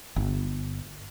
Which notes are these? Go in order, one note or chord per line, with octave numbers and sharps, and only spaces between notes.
G1